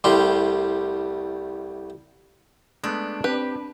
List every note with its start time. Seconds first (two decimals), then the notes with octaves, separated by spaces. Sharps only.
0.04 C2 A2 G3 G4 C6
2.84 G#3 A3 B3 D4
3.24 C4 G4 B4